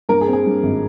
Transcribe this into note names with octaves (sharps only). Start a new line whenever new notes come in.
G2 A#3 A#4
G#4
C4
G#4
G2
G#1